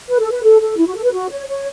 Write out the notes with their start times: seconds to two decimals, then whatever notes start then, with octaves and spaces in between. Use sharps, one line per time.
0.09 B4
0.19 A4
0.31 B4
0.43 A4
0.61 A4
0.78 E4
0.87 F#4
0.95 A4
1.04 B4
1.13 F#4
1.30 C#5
1.48 C#5